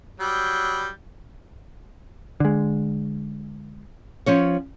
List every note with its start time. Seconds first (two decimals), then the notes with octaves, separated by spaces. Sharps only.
0.20 F#3 G3
2.40 D3 G#3
4.26 F3 C#4 C#5